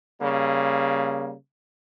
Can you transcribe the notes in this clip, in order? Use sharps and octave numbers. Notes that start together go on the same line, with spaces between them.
C#3 G3 A#3